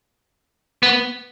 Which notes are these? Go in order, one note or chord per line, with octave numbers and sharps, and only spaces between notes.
B3